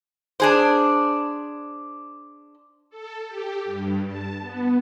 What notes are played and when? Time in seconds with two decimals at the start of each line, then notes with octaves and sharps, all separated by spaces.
0.40 D4 G#4 C5
2.90 A4
3.28 G4
3.65 G2
4.06 A5
4.41 B3